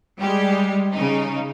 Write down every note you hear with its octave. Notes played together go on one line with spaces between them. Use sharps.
G3 G#3 G4
C#3 D#4